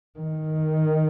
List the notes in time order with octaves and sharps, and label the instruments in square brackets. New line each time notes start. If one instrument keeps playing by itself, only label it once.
[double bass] D#3